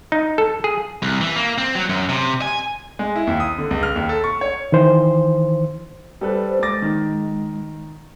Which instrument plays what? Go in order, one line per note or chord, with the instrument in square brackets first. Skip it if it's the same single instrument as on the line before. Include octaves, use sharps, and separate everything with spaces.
[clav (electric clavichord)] D#4
A4
G#4
[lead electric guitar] C2
E3
A#3
C4
F#3
F#2
C3
G#5
[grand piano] G#3
E4
D#2
D#6
D3
C#2
F6
D#2
A4
C#6
C#5
[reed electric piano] D#3 E3 C5
[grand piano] G3 A4 B4 [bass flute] C5
[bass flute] G#3 [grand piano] D6 A6 A#6
[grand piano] D#3